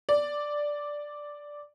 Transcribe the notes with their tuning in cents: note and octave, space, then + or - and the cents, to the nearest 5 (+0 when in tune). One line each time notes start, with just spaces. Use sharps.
D5 +0